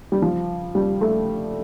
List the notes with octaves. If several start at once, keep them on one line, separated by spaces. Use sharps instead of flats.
G3
F3
G3
A3